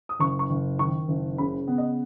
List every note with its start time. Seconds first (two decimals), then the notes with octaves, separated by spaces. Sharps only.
0.09 D#6
0.19 F#1 C#6
0.39 C#6
0.50 F#1
0.79 D#3 C#6
1.08 F#1
1.38 C#3 B5
1.68 B3
1.78 D#5